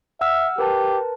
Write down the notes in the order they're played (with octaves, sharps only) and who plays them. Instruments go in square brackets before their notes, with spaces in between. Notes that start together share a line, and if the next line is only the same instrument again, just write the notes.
[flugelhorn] E5 [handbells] F#5 E6 F6
[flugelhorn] G4 [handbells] A#4 B4 A5